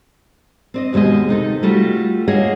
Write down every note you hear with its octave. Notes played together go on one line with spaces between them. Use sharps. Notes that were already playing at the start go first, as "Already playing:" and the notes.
C4 D5 D#5
D#2 B2 G#3 G4 D#5
C3 D#4 A4
G3 A3 F4 F#4
A#3 G#4 C#5 D#5 F#5